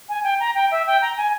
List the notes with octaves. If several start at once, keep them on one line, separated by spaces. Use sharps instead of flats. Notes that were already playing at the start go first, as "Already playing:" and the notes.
G#5
G5
A#5
G5
E5
G5
A#5
G#5